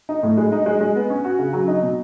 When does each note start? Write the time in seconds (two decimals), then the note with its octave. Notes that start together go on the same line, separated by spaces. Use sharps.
0.09 D#4
0.23 A2
0.37 G#3
0.52 D#4
0.66 G#3
0.81 G#3
0.96 B3
1.10 C#4
1.25 F#4
1.39 C#3
1.53 F#3
1.68 D#4
1.83 B2